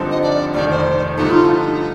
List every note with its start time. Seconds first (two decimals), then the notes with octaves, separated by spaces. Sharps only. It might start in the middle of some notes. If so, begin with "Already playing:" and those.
Already playing: G2 D3 F3 C4 D#4
0.11 D#5
0.23 D5
0.54 F1 F2 D#3 D5
0.71 C5
1.17 G2 D3 F3 A3 D#4
1.31 F4
1.44 D#4